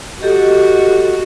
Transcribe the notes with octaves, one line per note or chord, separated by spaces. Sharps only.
F#4 G4 A4 D#5